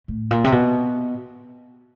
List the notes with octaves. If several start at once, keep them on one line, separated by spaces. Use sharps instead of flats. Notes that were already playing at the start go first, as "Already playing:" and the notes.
A2
A#2
C3
B2